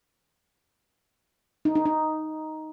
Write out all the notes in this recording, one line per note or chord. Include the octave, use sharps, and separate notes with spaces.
D#4
D#4
D#4